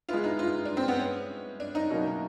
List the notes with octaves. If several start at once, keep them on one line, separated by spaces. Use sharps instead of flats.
G#3 B3 E4 F4
D#4
F4
D4
C4
B3
C#4
D4
D#4
B2 F#3 A#3 C#4 E4